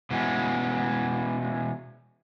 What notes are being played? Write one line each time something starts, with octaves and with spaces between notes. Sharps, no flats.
B2 E3 G#3 A#3 C#4